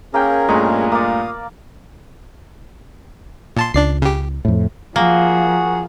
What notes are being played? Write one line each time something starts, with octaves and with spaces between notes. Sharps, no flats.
A#3 C#4 G#4 A#4 G5
G2 A#2 G#3 A3 A#5
A#3 D5 F5 D#6
A#2 A5 C6
C#2 D4 D5 C7
C#3 G4
F2 A2
F3 A#3 F#4 G#4